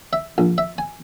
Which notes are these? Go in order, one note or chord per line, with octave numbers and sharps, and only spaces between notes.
E5
A#1
E5
G#5